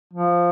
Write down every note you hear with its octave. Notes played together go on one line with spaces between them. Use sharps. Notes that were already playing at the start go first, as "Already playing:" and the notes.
F3